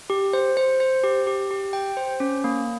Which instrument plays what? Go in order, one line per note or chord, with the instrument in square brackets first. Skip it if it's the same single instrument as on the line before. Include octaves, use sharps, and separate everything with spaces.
[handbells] G4
C5
C5
C5
G4
G4
G4
G5
C5
C#4
A#3